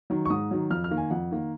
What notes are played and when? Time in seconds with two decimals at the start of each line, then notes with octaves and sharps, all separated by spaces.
0.10 D#3 F#3
0.25 C#6
0.30 G#2 D#6
0.51 D#3 F#3
0.70 F2 F6
0.84 F6
0.90 D#3 A#3
0.97 G#5
1.11 F2 F#5
1.31 D#3 A#3